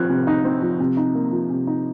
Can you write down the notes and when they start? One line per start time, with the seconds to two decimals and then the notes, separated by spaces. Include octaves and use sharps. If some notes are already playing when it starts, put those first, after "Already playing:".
Already playing: F3 C4 F6 F#6 G#6
0.10 C3
0.27 D#4
0.45 C4
0.62 F3
0.80 C3
0.97 D#4
1.15 A#3
1.32 F3
1.50 C3
1.67 D#4